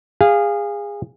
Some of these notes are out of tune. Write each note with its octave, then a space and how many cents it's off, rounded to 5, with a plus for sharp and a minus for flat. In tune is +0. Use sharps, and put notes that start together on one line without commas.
G#4 -25 F5 +0